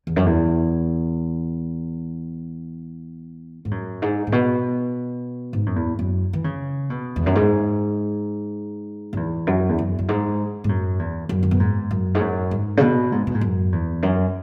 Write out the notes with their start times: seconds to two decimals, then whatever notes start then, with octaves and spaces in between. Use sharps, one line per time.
0.07 E2
0.16 F#2
0.26 E2
3.65 G#2
3.71 F#2
4.02 G#2
4.27 G#2
4.32 B2
5.53 G#2
5.66 F#2
5.76 E2
5.99 F#2
6.33 E3
6.44 C#3
6.90 B2
7.16 E2
7.26 F#2
7.35 G#2
9.13 F#2
9.17 E2
9.47 F#2
9.69 E2
9.78 F#2
9.99 F#2
10.09 G#2
10.64 G#2
10.69 F#2
10.99 E2
11.29 F#2
11.43 C#3
11.51 B2
11.60 G#2
11.91 F#2
12.15 G#2
12.21 F#2
12.51 G#2
12.77 C#3
12.81 B2
13.12 G#2
13.27 B2
13.34 G#2
13.41 F#2
13.72 E2
14.03 F#2